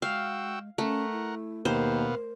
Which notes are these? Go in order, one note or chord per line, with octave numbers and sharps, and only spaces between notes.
G#3 F#4 F5 G5 E6
A3 C#4 A#4 F#5
E4
D#2 B2 B3 A#4 C5 F5